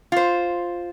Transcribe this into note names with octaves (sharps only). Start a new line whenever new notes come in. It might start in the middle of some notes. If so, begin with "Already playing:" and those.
F4 C5